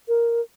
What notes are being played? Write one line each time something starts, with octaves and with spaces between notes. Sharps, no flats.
A#4